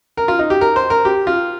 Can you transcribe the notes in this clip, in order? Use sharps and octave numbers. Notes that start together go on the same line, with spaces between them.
A#4
F4
D#4
G4
A#4
C5
A#4
G4
F4